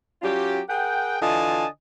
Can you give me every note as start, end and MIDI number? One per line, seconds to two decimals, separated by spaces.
0.22 0.61 54
0.22 0.61 61
0.22 0.61 65
0.22 0.61 67
0.70 1.18 68
0.70 1.18 70
0.70 1.18 78
0.70 1.18 79
1.21 1.66 50
1.21 1.66 52
1.21 1.66 65
1.21 1.66 75
1.21 1.66 80
1.21 1.66 81